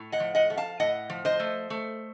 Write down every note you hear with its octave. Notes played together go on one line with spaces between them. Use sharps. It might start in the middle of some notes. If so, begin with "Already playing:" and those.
Already playing: A2
D#5 F#5
F3
D#5 F#5
A3
F5 A5
A2 D#5 F#5
F3
C5 D#5
A3
A3